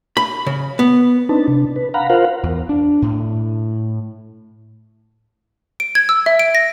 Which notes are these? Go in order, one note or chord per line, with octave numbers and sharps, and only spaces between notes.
B5
C#3
B3
C4 D4 D#4 B4 A5
C3 D4
B4
F5 F#5 A#5 B5
F4 A#4 C5 F5 F#5
E2
D4
A2
D7
G#6
E6
E5
D7
A#6